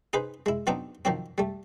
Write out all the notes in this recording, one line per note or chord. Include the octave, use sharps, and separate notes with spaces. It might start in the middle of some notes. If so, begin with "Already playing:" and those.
D#4 G#4 B4 C5
G#3 E4
F#3 B3 C4 D4 D#4
D#3 F3 F#3 C4
G3 A3